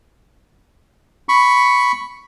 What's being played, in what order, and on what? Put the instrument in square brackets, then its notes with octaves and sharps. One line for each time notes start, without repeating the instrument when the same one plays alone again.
[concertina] B5 C#6